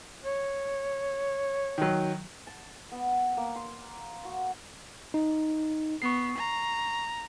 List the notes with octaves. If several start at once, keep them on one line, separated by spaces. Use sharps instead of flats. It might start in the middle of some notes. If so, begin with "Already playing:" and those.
C#5
D#3 F#3
A5
B3
A#3
C6
F#4
D#4
B3 C#6 C7
A#5